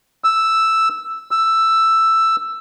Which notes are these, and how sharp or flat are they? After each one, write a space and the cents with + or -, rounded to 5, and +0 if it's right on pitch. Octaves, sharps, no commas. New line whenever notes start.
E6 +0
E6 +5